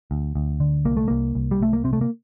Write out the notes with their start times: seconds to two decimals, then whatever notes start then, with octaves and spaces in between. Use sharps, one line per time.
0.11 D2
0.35 D2
0.60 D3
0.85 C2 A#3
0.97 A3
1.08 C2 A#3
1.35 C2
1.51 G3
1.60 C2 A3
1.73 A#3
1.84 C3 C4
1.93 A3
2.01 A#3